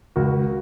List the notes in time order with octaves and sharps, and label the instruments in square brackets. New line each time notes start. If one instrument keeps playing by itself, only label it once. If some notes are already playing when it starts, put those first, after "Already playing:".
[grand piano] C#2 F#4 A#4